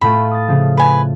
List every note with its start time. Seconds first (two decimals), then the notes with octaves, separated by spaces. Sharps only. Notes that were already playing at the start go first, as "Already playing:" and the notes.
0.01 A2 A3 F4 B5
0.31 D#6 A6
0.48 C#3 F3
0.77 B4 G#5